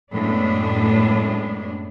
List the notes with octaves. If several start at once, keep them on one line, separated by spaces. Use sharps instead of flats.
F#2 A2 G#3 B3 D4